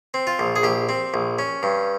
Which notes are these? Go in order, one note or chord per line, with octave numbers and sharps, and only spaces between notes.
C4
F4
A#1
G#4
A#1 G4
C4
A#1
C#4
G2